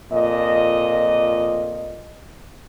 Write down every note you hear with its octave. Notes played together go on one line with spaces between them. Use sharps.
F2 A#2 D#5